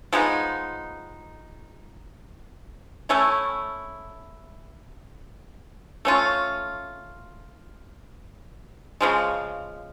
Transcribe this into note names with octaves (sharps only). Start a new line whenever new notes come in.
F3 G#3 B3 D#4
A3 C#4 E4
A3 C#4 F4
C#3 F3 G#3